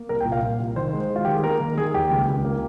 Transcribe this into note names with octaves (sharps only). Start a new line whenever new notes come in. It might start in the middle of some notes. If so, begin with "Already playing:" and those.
Already playing: A#3
C2 A#4
G5
A#2
F5
A#2
C2
D#3 C5
G#3
G#3
F4
D#3 G4
G#4
A#3 A#4
D#3
D#3 G#4
D#2 G4
C#2
C#2
A#3